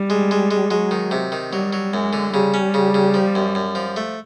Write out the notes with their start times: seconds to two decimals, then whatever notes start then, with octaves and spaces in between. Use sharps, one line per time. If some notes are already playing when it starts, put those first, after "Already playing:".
Already playing: G3
0.10 G#3
0.31 G#3
0.51 G#3
0.71 F#3 G#3
0.91 D#3
1.11 C3
1.32 D#3
1.52 F#3 G3
1.73 F#3
1.93 F#2 G#3
2.13 D3
2.34 C#3 G3
2.54 C#4
2.74 C#3
2.94 C#3
3.14 F3
3.35 F#2
3.55 F#2
3.75 F3
3.96 A3